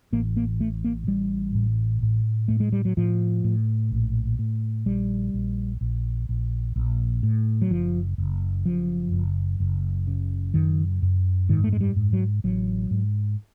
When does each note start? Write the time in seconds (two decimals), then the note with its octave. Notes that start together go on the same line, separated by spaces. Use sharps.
0.13 A1 A#3
0.37 A#3
0.60 A2 A3
0.85 A#3
1.07 A1 G3
1.55 A2
2.02 A2
2.48 A2 A3
2.60 G#3
2.73 G3
2.85 F#3
2.97 A2 F3
3.44 A2
3.91 A#1
4.39 A2
4.86 A#1 G3
5.34 A#1
5.81 A#1
6.29 A#1
6.76 A#1
7.23 A2
7.62 F#3
7.70 F#1 F3
8.18 F#1
8.65 F#2 F3
9.12 F#1
9.60 F#1
10.07 C#3
10.54 F#2 D#3
11.02 F#2
11.49 G#2 D#3
11.64 A3
11.73 G#3
11.81 G3
11.96 G#2
12.13 F#3
12.44 A1 F#3
12.91 G#2